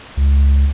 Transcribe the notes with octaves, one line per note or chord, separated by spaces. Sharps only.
C#2